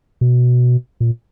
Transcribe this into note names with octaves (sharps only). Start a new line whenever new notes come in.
B2
A#2